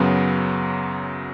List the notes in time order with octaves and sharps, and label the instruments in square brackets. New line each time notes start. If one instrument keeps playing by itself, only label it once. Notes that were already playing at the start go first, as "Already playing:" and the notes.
Already playing: [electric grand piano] F#2 C#3 F#3 B3